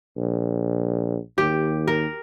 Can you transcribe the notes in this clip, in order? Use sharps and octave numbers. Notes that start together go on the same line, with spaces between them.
A#1
D#2 G4
A#4